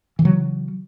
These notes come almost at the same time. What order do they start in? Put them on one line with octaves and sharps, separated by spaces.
E3 C#3 F#3